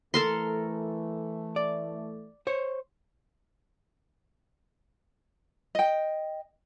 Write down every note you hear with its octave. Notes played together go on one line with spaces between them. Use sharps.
E3 A3 A4 A#4 C6
D5
C5 C#5
D#5 G5